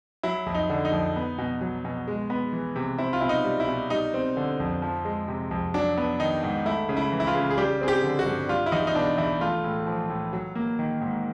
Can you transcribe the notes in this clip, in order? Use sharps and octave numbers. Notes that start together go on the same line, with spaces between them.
F#3 E4
F2
D#4
D3
D#4
F2
B3
B2
F#3
B2
G#3
B3
E3
C3
C4 E4
F4
B2 E4
D#4
G3
E4
B2
G3 D#4
C4
D3
F2
F3
G#3
C3
F2
F#3 D4
B3
D#3 D#4
G#2
A3 E4
C#3
E4
E3
E4
F4
C#3
G#4
G3 G4
C4 G#4
G4
D3
F#4
G2
G3 F4
E4
E2 D#4
D#4
B2 D4
E2 E4
A3 F4
A2
F3
A2
F#3
A#3
D#3
G#2